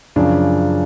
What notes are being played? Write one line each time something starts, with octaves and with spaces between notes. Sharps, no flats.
F#2 C#3 F3 D4